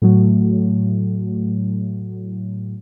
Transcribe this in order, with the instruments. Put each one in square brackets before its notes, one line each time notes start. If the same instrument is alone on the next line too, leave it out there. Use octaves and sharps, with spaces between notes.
[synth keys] A2 F#3 A3